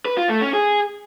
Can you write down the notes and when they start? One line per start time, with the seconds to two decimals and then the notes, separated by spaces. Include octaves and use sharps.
0.05 B4
0.17 F4
0.29 A3
0.41 C#4
0.53 G#4